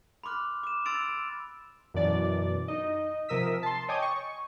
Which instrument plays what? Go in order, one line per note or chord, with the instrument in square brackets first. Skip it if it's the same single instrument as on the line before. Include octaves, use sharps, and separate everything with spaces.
[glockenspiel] B5 C6 D6 F6 F#6
D6 E7
C6 E6 A6 D7 F7
E6
[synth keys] F#2 B2 E3 D5 A6
D#4 D#5
C3 F3 A#4 D#6 E6 B6
A5 C6
C#5 D#5 G5 G#5 D6 D#6
C#6